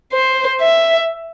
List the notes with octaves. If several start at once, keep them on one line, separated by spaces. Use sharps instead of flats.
C5
E5